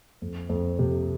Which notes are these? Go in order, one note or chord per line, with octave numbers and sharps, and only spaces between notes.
F2
F2
C3